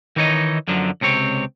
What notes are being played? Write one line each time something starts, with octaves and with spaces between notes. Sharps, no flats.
D#3 E3 D#4 C#5 D#5
F#2 D3 F3 F#3
C#2 C3 C4 C#5